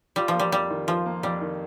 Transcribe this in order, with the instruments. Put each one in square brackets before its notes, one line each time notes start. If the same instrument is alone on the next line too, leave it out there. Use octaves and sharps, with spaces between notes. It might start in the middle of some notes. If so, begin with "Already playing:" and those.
[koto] G3 [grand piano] F4
[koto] F3
[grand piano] A#3
[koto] G3
[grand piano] F2 [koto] G3
[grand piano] D#3
[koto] F3 [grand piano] F4
[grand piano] A#3
[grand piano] F2 [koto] G3
[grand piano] D#3